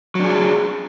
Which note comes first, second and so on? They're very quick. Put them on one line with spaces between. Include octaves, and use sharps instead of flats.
F#3 D4 G#4